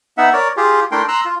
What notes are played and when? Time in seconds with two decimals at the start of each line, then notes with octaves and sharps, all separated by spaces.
0.18 B3 D#4 E5 F#5
0.33 A#4 C#5 D5
0.57 F4 G4 G#4
0.92 A3 D4 E4 A#4 G5 C6
1.08 A#5 C6 E6 F#6
1.25 F4